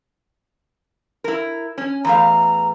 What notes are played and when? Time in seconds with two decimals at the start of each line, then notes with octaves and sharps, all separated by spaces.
1.24 E4 A#4
1.78 C#4
2.05 E2 A2 F5 A#5